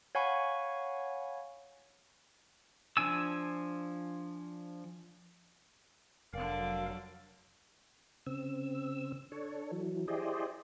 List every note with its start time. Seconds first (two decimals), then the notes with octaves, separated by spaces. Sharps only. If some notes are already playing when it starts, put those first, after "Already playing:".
0.15 C#5 F5 F#5 G#5 B5 C#6
2.97 F3 D4 G#5 E6
6.34 F1 D3 F#3 A#4 D5 F5
8.26 C#3 C4 E6
9.32 D4 A4 C#5
9.71 E3 F#3
10.08 E4 G4 G#4 C5 D5 D#5